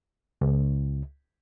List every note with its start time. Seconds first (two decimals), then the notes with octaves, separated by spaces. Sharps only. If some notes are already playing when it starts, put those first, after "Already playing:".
0.41 C#2